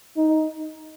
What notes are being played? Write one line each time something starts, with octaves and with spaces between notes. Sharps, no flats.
D#4